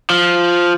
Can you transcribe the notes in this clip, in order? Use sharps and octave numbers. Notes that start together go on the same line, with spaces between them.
F3